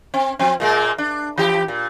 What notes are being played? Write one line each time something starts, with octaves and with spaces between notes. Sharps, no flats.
C4
F3 C4
A#2 G#3 A#3
D4
E3 G4
A#2